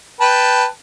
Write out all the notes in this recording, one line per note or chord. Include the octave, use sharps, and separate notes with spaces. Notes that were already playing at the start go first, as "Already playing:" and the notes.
B4 G5 A5